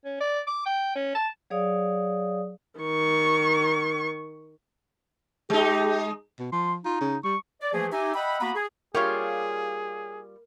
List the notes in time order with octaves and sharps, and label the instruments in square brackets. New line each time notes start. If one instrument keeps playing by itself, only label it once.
[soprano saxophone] C#4
D5
D6
G5
C#4
A5
[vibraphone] F#3 G#4 C#5 D5 F5 D#6
[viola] D#3 C#6
[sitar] G#3 D#4 [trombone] G4
[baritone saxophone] B2
[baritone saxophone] F3 [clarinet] C6
[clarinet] D#4 [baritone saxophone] F4
[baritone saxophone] C#3
[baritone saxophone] G3 [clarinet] C#6
[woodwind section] D5
E3 F3 A3 A#3 G#4
D#4 G4 E5 G#5
D#5 E5 F#5 G5 B5
A#3 B3 F#4 A#5 B5
G#4
[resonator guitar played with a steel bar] G3 F4 [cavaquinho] G4 C#5 F5 [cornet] G#4 [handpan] A#4